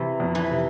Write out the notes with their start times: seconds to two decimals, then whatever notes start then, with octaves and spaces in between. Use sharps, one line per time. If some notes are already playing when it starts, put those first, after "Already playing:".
Already playing: C3 E3
0.20 F2
0.35 E3
0.50 C3